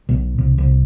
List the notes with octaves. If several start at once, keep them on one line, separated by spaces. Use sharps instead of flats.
B1
C2
C2